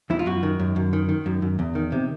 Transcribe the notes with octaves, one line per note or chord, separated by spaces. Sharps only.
E2 E4
F4
F#2 F#4
D#3
F#2
F#2
D#3
D#3
F#2
F#2
E2
D#3
C3